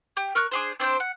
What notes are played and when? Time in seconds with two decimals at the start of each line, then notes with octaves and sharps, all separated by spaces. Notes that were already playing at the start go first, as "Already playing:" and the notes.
0.17 G4
0.35 A#4 C#6 F6 F#6
0.51 D4 G#4 C5
0.80 C4 D4 C5 G5
1.00 F#5